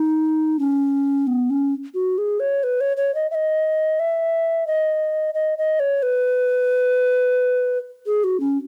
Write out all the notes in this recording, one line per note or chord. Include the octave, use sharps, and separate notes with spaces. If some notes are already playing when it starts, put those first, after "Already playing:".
Already playing: D#4
C#4
B3
C#4
F#4
G#4
C#5
B4
C#5
C#5
D#5
E5
D#5
E5
D#5
D#5
D#5
C#5
B4
G#4
F#4
C#4